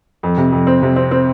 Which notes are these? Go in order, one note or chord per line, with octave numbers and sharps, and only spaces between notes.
F2
C3
F2
C4
C3
C4
C4